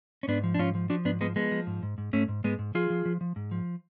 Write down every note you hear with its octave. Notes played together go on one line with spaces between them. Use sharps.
C#4
G#2 B3 D4
F3
D4
G#2 C#4 F4
F3
F3 D4 F#4
G#2 B3 D4
F3 G#3 B3
F3 G#3 B3
F3
G#2
G#2
G#2
G#2 A3 C#4
G#2
G#2 G#3 B3
G#2
F3 F4 G#4
F3
F3
F3
G#2
F3